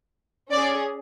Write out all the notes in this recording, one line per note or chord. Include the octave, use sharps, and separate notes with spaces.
C#4 G#4 D5